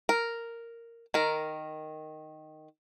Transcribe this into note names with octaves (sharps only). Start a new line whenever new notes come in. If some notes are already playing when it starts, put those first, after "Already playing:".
A#4
D#3 A#4